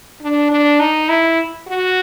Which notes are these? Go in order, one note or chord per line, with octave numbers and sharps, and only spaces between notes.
D4
D4
D#4
E4
F#4